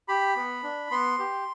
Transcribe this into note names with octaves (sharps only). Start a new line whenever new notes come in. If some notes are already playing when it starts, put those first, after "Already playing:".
G4 B5
B3
D4
B3 C6
G4